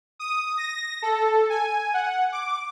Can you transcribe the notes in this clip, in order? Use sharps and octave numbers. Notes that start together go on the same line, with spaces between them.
D#6
A#6
A4
G#5
F#5
D6